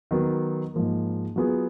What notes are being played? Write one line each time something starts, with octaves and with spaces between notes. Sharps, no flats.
D#3 F#3 B3
G#2 F3 A#3
F#3 B3 F4 G#4